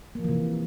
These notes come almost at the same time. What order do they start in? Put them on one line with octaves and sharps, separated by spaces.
A#3 F3 E3 C3